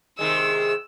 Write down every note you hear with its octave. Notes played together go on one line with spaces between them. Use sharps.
C3 D#3 G#3 E6